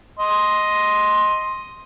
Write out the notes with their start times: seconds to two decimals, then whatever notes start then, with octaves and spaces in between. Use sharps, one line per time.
0.19 D#5 C6